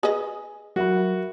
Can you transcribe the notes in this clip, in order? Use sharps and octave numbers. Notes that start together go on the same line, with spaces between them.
G#4 B4 D#5 G#5
F#3 F#4 A#4 E5 B5